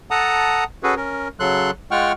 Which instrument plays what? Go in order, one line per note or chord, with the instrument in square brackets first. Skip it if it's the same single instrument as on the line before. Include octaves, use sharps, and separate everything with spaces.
[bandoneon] A4 F#5 A5 A#5 D#6
C#4 F#4 G#4 A4 B4
C#4 A#4
C#3 F#3 A4 C6 F#6
G#3 F4 F#5 G5 C#6 F6